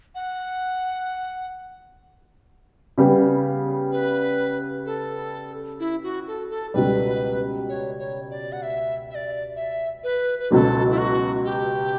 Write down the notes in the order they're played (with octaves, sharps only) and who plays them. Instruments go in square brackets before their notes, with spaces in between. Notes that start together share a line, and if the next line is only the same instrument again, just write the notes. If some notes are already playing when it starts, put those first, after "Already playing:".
[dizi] F#5
[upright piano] C#3 G3 B3
[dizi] B4
A4
E4
F#4
A4
A4
[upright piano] C#2 B2 G3 [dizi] B4
[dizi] C#5
C#5
D5
F#5
E5
E5
D5
E5
B4
B4
[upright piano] C#2 B2 F#3 [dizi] A4 B4
[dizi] E4
F#4
G4